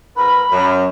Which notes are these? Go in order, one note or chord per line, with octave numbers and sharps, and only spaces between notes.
G#2 A#4 B4 B5
F#2